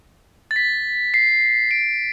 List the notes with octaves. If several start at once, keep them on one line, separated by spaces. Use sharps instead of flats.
A6
B6
C7
D7